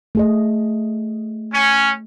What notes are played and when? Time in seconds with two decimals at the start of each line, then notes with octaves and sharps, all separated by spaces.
0.15 A3 G#4 D#5
1.53 C#4